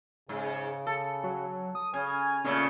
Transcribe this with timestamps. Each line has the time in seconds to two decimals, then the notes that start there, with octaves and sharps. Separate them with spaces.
0.29 G#2 C#3
0.87 A4
1.24 F#3
1.75 D#6
1.94 C#3 G#5 F6 G#6
2.45 A#2 C#3 A3 C#4